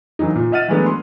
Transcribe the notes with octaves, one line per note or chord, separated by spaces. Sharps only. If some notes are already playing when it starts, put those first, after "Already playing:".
D3 E3 F#3 D#4
A#2
D#5 E5 F#5 F6 A6 D#7
E3 F#3 G#3 A3 B3 D4
C6